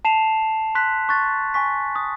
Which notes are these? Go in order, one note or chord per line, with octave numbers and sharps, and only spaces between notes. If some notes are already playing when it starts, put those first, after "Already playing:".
A5 C7 E7 F7
C6 F#6 B6
C#6 F#6 A6
G#5 C#6 B6
D#6